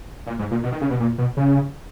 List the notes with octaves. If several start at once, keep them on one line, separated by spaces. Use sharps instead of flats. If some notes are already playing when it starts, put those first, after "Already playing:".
A#2
G#2
A#2
B2
D#3
C#3
B2
A#2
B2
C#3